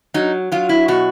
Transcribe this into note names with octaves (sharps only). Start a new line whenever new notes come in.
F#3 D#4
F#3 F4
E4
B2 F#4